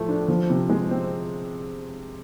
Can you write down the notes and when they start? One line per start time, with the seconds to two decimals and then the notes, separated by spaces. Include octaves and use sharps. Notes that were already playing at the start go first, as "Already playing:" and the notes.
Already playing: A2 F3 A3
0.09 D4
0.28 F3
0.50 C3
0.70 G#3
0.91 C4